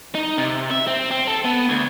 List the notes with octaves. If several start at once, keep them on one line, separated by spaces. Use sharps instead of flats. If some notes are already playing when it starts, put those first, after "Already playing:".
D#4
C3
E5
C4
C4
A4
B3
D2